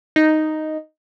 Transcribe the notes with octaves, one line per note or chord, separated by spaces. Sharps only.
D#4